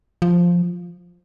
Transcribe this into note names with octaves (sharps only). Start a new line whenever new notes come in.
F3